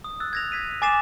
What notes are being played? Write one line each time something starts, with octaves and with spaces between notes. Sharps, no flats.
D#6
E6 F#6 A6
G#6 A#6 F7
G#6 B6 D#7
G#5 D6 A6 C7 E7